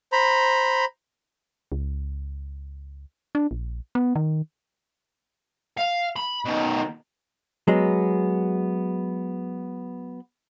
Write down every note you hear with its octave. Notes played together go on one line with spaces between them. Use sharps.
C5 A#5 B5
C#2
D4
A#1
B3
D#3
F5
B5
B2 D#3
F#3 G#3 B3